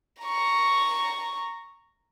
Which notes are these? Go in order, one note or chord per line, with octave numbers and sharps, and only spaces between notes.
A#5 C#6